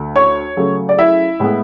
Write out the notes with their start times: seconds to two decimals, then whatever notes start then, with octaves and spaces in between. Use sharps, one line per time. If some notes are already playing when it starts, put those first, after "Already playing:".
Already playing: D2 D3 A3
0.16 C#5 C#6
0.57 C#3 F#3 A3
0.89 D5
0.98 E4 E5
1.40 A2 G#3 B3